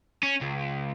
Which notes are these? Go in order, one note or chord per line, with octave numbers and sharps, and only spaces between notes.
C#4
C#2